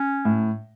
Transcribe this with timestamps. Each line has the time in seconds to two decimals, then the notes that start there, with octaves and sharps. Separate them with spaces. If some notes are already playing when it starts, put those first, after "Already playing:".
Already playing: C#4
0.25 A2